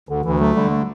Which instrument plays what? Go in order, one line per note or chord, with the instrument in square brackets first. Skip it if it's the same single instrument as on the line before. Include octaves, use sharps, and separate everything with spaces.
[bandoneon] D2 [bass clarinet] D3
[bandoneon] D2 [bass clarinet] E3
[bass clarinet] F#3 [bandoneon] A3
[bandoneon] D3 [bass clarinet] G3
[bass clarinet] A3